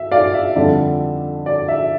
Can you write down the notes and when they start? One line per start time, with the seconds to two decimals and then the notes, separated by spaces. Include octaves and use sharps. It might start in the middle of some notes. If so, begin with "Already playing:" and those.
Already playing: E5
0.12 D5 F5
0.34 E5
0.56 F2 D3 G3 D4
1.46 D5
1.68 E5